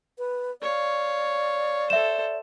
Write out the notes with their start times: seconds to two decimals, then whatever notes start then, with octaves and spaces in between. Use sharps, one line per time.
0.18 B4
0.62 C#5 D5 F5
1.90 A4 C5 E5 E7